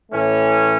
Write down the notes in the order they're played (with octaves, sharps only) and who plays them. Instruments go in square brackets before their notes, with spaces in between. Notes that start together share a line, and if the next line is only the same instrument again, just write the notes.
[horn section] A2 E3 A3 C#4